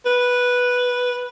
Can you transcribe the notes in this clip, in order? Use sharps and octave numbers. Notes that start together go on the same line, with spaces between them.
B4